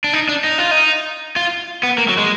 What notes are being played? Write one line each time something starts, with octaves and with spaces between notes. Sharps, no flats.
D4
D#4
D4
D#4
F4
D#4
F4
B3
A#3
F#3
G#3